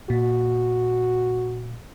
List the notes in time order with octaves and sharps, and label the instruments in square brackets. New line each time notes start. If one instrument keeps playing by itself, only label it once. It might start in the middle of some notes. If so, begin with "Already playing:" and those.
[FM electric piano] A#2 [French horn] F#4